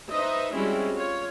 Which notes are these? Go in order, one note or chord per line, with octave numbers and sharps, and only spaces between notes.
D#4 B4 C5 D#5 E5
G3 G#3 C4 C#4 E4 F#4
F4 C#5